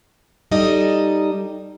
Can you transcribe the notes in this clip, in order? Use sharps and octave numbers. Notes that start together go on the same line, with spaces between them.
G3 D#4 A4 D#5